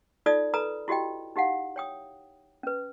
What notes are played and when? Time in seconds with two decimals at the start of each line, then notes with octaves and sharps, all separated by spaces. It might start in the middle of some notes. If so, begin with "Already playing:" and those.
0.26 D#4 F4 A4 D5 D#6
0.54 A4 B4 A#5 B5 D#6
0.88 E4 F#4 G4 D#5 G5
1.36 D#4 G4 F5 F#5
1.76 C#5 G5 D#6
2.63 C#4 B4